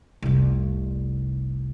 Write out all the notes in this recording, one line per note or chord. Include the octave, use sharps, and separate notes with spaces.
F1 C2